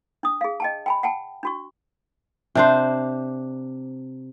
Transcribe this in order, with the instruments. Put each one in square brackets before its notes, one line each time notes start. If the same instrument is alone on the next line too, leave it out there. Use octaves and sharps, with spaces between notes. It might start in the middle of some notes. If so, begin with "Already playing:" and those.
[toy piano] D4 D#6
G#4 F5
D#5 G5 A5
G5 G#5 B5
F#5 G5 A5
D4 F#4 C#6
[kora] C3 D4 C5